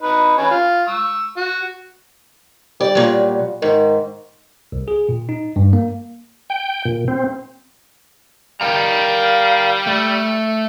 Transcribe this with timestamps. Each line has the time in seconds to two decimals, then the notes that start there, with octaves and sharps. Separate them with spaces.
0.02 D#4 B4
0.38 C#4 B4 G#5
0.51 F4
0.87 C#6 E6
1.37 F#4
2.81 G3 D5
2.95 A#2 F#3
3.62 G#2 D#3
4.72 C2
4.88 G#4
5.09 A#2
5.29 D#4
5.56 G2
5.73 A#3
6.50 G5
6.85 A#2
7.08 C4
8.61 G3 A#4 F5 G5 A#5
9.87 A3